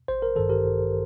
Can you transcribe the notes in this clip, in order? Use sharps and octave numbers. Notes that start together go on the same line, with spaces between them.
A1 C5
A#4
G2 D#3 A4
G4 A#4
A1